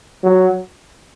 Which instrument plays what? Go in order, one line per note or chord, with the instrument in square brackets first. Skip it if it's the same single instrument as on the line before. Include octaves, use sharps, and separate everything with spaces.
[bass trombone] F#3